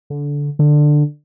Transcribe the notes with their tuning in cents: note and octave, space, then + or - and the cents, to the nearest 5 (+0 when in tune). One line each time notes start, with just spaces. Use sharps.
D3 -20
D3 +15